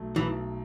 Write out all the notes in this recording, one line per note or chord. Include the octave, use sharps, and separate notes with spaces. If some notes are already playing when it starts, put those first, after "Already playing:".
Already playing: B1 F#3 A3
B1 E3